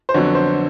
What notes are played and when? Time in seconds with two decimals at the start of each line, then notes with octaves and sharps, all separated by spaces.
0.09 C5
0.14 F2 D3 F#3 B3 C#5
0.35 C5